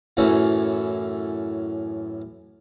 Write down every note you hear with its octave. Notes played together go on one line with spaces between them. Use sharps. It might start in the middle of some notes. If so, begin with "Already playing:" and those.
F#2 A2 E3 C#4